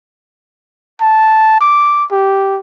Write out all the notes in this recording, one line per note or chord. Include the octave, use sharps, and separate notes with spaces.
A5
D6
G4